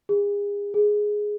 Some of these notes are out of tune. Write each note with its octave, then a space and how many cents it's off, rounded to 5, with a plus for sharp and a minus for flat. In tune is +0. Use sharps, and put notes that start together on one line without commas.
G#4 -35
G#4 +5